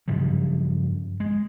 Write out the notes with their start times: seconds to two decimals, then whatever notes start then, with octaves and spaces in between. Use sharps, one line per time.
0.08 G2 C#3 F3 F#3
1.20 G#3